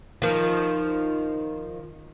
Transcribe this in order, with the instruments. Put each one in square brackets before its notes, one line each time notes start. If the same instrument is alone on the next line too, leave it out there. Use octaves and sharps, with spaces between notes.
[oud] D#3 F3